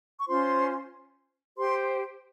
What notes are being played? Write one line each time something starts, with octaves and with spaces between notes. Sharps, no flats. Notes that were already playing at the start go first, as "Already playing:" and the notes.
C#6
C#4 F4 C5 C6
G4 C5 C6